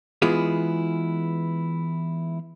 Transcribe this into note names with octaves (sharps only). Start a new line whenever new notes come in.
E3 G#3 B3 E4 F4 G#4